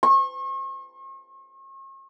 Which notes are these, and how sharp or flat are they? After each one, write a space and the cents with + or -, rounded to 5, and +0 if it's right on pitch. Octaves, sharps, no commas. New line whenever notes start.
C#6 -45